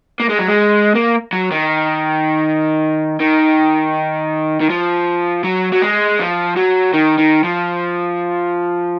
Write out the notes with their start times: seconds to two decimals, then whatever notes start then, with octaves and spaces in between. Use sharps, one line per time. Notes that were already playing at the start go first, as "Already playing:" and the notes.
0.20 A#3
0.29 G#3
0.38 F#3
0.48 G#3
0.95 A#3
1.33 F#3
1.51 D#3
3.20 D#3
4.60 D#3
4.70 F3
5.44 F#3
5.72 F#3
5.82 G#3
6.19 F3
6.57 F#3
6.94 D#3
7.19 D#3
7.44 F3